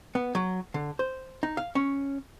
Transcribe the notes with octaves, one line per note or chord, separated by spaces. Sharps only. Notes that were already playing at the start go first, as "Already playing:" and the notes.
B3
F#3
D3
C5
D#4
F5
C#4